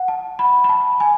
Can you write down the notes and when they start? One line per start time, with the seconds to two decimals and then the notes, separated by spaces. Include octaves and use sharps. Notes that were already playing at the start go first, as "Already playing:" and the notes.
Already playing: F#5
0.08 A5
0.39 B5
0.64 B5
0.69 A5
1.00 G#5